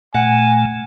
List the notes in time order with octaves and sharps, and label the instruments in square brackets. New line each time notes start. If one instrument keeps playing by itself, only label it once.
[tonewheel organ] A#2 A3 [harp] F#5 [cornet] G#5